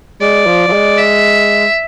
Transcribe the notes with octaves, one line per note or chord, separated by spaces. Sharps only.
G#3 D5
F3
F3
G#3
E5